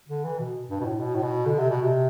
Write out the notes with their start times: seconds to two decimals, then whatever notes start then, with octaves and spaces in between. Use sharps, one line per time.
0.09 D3
0.24 E3
0.39 B2
0.70 G2
0.81 B2
0.85 A2
1.00 B2
1.16 A2
1.23 B2
1.46 D3
1.58 C3
1.70 B2
1.82 C3